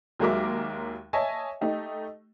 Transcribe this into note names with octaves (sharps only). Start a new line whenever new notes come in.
D#2 F#3 G#3 A#4 E5 D6
C#5 D#5 E5 G#5 A5
A3 D#4 G4